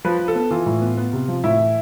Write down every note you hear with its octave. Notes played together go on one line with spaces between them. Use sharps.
F3 B4
F3
A4
B3
E3 F4
A2
B3
B3
C3
F3
A2 E4
E3